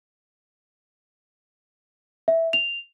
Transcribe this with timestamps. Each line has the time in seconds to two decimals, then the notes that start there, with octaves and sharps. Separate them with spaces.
2.28 E5
2.53 F7